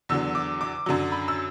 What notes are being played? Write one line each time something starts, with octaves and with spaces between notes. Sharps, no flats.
E2 D3 F#3 E6
D6
D6
F#2 D3 F#3
B5
E6